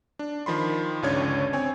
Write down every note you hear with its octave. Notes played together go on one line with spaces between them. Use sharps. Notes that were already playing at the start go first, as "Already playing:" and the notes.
D4
D#3 F3 B5 C6
G1 C#2 C#3 D4 C#5 G#6
C4 C#5 G#5